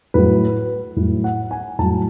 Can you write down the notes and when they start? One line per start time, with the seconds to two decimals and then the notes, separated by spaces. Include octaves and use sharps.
0.14 A2 F#3 B4
0.97 A2 F#3
1.24 F#5
1.51 G#5
1.79 A2 F#3 A5